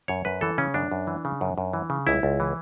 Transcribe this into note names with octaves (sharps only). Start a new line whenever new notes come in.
F#2 C#5
F#2 B4
E3 A4
C#3 C#4
F#2 D4
F#2
E3
C#3
F#2
F#2
E3
C#3
C#2 E4
C#2
E3